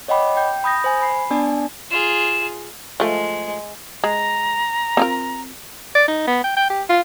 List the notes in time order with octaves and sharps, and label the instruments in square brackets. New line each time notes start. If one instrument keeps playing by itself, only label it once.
[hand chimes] C#5 D#5 F#5 G5 B5 D6
G5 G6
B5 D#6 G6 A#6
C5 G#5
B5 C7
B3 D4 D5 G#5 A5
[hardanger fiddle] F4 G#4 [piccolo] E7
[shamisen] F3 A3 [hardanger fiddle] G#3
[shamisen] G#3 [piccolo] A#5
[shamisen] C4 F4 A#4
[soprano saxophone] D5
D#4
B3
G5
G5
G4
F4